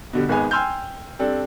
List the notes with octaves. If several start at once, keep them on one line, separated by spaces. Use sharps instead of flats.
B2 D3 G3
G#1 G#3 B3 G#5
G5 G#5 C6 E6 F6 G6
G3 C4 D4 A4